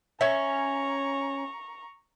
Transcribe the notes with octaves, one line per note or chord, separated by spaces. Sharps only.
C#4 C#5 E5 A#5 C#6